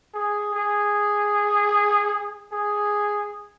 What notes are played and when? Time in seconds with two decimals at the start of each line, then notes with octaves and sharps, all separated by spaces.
0.14 G#4
0.54 G#4
2.52 G#4